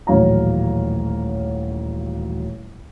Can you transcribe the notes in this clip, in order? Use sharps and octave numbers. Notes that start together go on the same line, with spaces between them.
D#1 A1 F#3 C#5 F5 A#5